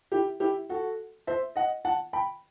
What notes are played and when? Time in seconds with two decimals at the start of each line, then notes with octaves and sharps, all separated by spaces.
0.12 E4 G4
0.40 E4 G4
0.69 F#4 A4
1.27 C5 E5
1.56 D#5 F#5
1.85 F#5 A5
2.13 G5 B5